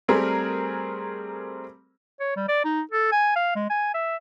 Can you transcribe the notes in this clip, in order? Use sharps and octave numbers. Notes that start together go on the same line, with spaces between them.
G3 A3 C4 G#4 A#4
C#5
G3
D5
D#4
A4
G#5
F5
G#3
G#5
E5